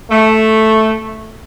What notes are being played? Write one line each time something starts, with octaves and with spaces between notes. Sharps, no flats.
A3